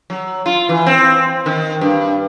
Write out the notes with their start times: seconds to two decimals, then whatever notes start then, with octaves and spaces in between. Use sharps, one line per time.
0.10 F#3
0.46 F4
0.69 E3
0.86 C4
1.46 D#3
1.81 G2